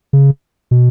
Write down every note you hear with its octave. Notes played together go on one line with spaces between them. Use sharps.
C#3
B2